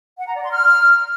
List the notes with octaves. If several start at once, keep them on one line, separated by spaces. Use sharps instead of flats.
F#5
A#5
D5
C6
F6